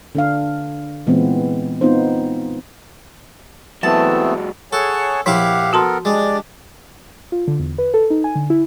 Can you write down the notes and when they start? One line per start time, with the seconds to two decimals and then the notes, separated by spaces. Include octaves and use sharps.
0.15 D3 D4 F5
1.07 A#2 E3 G#3 B3 C4
1.81 B3 C4 D#4 F4 C5
3.83 E3 F#3 G#3 A3 B3 C4 A5
4.73 G#4 A4 C#5 F#5 G#5 A5 C#6
5.26 A#1 F3 E4 G4 F5 F#5 D6
5.73 B3 F#4 A4 A#4 A5 C6
6.05 G#3 D4 G4 D5
7.32 F4
7.48 D3
7.59 E2
7.78 B4
7.94 A4
8.10 D#4
8.24 G#5
8.35 D3
8.50 E4